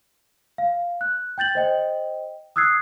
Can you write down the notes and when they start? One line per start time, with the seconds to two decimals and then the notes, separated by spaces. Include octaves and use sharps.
0.58 F5
1.01 F#6
1.38 G5 G6 A6 F#7
1.55 C5 D#5 G5
2.56 D#6 E6 F#6 G#6 C7